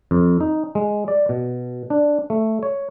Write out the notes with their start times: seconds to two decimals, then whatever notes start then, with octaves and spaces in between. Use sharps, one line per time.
0.11 F2
0.40 D#4
0.75 G#3
1.08 D5
1.29 B2
1.90 D4
2.30 A3
2.63 C#5